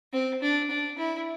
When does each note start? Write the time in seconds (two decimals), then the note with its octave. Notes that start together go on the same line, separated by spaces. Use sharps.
0.13 C4
0.42 D4
0.70 D4
0.98 E4